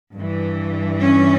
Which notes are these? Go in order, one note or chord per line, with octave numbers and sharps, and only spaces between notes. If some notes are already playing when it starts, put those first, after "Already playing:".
G2 E3
C#4